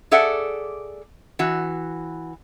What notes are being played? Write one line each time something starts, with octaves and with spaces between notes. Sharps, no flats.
G#4 A4 D5 E5 F#5
E3 F#4